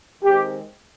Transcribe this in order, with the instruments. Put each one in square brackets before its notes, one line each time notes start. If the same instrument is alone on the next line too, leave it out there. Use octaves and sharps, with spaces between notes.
[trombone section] D#3 G#3 C4 G4